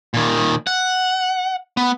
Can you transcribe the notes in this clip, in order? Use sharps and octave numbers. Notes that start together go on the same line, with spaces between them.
A#2 D#3
F#5
B3